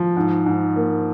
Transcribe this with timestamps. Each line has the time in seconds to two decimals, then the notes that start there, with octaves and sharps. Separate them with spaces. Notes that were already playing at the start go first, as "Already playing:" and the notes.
Already playing: F3
0.16 G#2
0.46 G#2
0.76 A#3